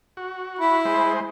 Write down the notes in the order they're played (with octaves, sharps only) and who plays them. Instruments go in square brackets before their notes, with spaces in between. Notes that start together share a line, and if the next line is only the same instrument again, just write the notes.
[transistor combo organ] F#4
[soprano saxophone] E4 [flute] B5
[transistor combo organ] G#3 C5